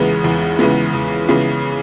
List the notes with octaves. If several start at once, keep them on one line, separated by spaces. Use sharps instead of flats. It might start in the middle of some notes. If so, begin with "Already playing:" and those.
Already playing: E2 C#3 E3 G#3 B3
E2
C#3 E3 G#3 B3
E2
C#3 E3 G#3 B3